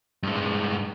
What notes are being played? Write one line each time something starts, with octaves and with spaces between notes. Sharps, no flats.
G2 G#3